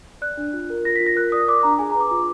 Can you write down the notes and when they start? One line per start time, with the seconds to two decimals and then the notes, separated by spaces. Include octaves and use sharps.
0.22 D5 F#6
0.37 D4
0.53 F4
0.70 A#4
0.85 F4 A#6
0.96 B6
1.00 F4
1.06 A#6
1.16 A#4 F#6
1.32 D5 D#6
1.47 D5 D6
1.63 D4 A#5
1.79 G#4 G#5
1.90 A#5
1.94 B4
2.00 D6
2.11 F4